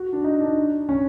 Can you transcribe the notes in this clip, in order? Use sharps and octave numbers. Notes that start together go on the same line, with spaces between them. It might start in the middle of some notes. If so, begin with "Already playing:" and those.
Already playing: F#4
D4
D#4
D4
C#4